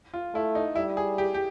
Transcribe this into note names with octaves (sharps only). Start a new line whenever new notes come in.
F4
A3 E4
D#4
G3 E4
G#4
G4
G4